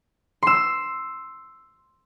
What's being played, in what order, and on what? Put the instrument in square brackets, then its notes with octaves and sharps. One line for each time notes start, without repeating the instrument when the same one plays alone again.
[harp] C6 E6